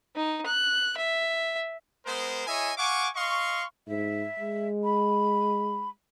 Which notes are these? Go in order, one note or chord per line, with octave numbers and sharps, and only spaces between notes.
D#4
F#6
E5
G#3 B3 A#4 C5
E4 G#4 C#5 D#5 E5 G#5
F5 F#5 G#5 C#6 D6
D#5 F5 C6 C#6
G#2 E5
G#3
B5